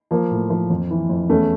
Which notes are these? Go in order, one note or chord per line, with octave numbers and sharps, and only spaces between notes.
F3 A#3
A2
F3
F2
E3
F2
E2 A3 C#4